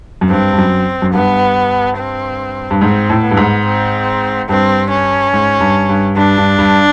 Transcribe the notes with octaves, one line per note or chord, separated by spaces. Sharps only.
F#2
G2 C4
G2
F#2
F#2
G2 B3
C4
G2
G#2 C4
A2
B3
G2
G#2
C4
G2 C4
C#4
G#2
G2
G2
G2 D4
G2
G2